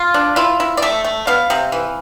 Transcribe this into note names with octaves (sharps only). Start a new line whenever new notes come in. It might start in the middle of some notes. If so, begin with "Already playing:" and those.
Already playing: F4
D4
E4 F4
E4
D5
A3 E5
A3
B3 F5
C3
E3